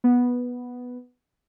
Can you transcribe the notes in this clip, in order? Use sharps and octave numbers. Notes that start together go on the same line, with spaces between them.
B3